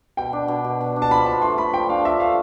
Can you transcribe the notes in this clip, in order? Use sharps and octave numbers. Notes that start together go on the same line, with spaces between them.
B2 G5
D4
B2
B2
B2
D4
A5
F3 B5
F3 A5
A3 C6
A3 B5
F3 G5
D4 F5
F3 E5
A3 F5